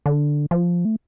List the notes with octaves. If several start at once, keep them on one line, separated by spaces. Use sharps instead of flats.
D3
F3
A3